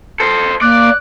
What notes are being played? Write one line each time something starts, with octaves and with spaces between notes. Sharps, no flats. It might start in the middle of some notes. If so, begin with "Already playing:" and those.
A4 C5
A#3 D5 F#6